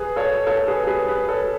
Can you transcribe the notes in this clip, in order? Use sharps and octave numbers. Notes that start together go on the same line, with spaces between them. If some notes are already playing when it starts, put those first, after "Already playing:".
Already playing: G#4 B4
A4 C#5
A4 C#5
G#4 B4
G#4 B4
G#4 B4
A4 C#5